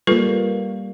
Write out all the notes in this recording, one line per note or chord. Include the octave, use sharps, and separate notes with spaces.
G3 A#3 F4 A4 B4